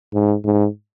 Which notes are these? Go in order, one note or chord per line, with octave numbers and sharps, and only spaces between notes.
G#2
G#2